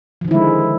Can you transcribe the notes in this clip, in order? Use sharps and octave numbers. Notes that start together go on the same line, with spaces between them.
D3 D#3 F3 G#3 E4